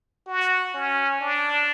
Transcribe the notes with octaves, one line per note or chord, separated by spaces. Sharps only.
F#4
C#4
D4